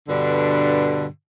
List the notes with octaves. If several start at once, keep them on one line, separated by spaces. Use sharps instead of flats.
G2 B2 D3